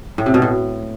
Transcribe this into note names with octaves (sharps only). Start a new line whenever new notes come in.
A2
C3
B2
A2